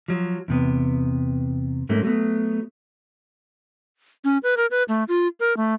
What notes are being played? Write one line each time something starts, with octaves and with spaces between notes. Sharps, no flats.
F3 F#3
E2 C3 B3
G#2 F#3 A3 A#3 C#4
F#3 A3 B3
C#4
B4
A#4
B4
A3
F4
A#4
A3